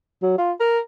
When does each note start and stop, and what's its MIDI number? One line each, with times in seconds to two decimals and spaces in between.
0.22 0.38 54
0.38 0.52 65
0.60 0.79 70